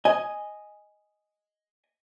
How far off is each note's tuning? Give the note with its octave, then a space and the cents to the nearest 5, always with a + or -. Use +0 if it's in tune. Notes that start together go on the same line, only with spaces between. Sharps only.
D#5 +0 G#5 +0